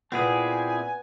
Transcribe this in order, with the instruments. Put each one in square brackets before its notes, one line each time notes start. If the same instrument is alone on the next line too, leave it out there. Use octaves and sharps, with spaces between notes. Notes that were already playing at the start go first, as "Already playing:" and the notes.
[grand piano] A#2 [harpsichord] B3 [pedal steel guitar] C4 E4 G#4 [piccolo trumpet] G#5